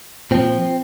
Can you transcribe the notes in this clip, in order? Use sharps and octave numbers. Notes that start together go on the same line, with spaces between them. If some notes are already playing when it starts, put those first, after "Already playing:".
A#2 F3 C4